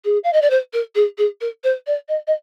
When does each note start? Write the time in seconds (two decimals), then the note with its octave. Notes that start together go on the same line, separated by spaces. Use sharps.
0.05 G#4
0.24 F5
0.33 D#5
0.42 D5
0.50 C5
0.73 A#4
0.95 G#4
1.18 G#4
1.41 A#4
1.64 C5
1.87 D5
2.08 D#5
2.27 D#5